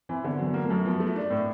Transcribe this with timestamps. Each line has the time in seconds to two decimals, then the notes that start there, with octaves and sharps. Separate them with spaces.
0.09 E3 C4
0.23 D3 B3
0.39 F#3
0.44 B3
0.54 A#3
0.65 A3
0.70 F#2
0.85 F3 B3
1.00 A3
1.16 D4
1.30 A2